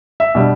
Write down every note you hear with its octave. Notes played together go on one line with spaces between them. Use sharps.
E5
B2 G3 D4